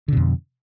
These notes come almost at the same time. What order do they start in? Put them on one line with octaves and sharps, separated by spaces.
D3 B2 F2